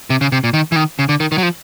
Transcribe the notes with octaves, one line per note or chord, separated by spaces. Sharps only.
C3
C#3
C3
A#2
D#3
E3
D#3
C#3
D3
D#3
D#3
F#3
F3